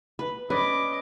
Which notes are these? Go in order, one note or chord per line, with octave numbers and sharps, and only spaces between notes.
B4
C#4 B4 D5 D#5 D6